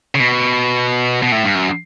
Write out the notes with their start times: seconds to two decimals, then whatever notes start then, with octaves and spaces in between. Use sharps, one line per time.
0.15 C#3
0.20 B2
1.22 B2
1.32 A2
1.44 G2
1.55 F#2